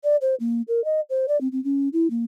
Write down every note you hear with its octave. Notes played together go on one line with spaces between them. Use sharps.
D5
C5
A#3
A#4
D#5
C5
D5
C4
C4
C#4
E4
A#3